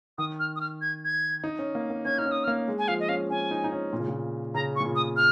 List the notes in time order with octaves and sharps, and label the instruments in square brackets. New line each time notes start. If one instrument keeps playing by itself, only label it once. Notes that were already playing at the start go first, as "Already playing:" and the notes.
[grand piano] D#3 [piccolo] D#6
[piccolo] F6
D#6
F6
G#6
G#6
[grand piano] D#4
C#4
A#3
A#3
[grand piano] C#4 [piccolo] G#6
[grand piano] D#4 [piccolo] F6
[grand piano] C#4
[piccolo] D#6
F6
[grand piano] A#3
G#3
[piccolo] G#5
[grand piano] F3 [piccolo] F5
[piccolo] D#5
[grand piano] C#4 [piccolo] F5
[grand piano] C#4 [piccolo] G#5
[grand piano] D#4
D#4
C#4
A#2
C#3
A#2
[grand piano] C#3 [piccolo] A#5
[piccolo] C#6
[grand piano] A#2
C#3
[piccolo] D#6
F6